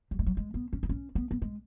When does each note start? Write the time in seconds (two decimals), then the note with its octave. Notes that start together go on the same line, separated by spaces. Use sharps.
0.11 F#3
0.19 G#3
0.26 F#3
0.37 G#3
0.54 B3
0.73 C#4
0.83 E4
0.89 C#4
1.15 B3
1.31 B3
1.42 G#3